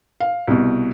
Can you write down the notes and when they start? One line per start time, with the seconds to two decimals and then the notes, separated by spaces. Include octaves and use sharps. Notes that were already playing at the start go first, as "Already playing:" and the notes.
0.20 F5
0.47 C2 B2